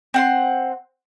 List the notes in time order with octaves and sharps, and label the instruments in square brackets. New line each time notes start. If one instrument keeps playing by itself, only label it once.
[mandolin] C4 F#5 C6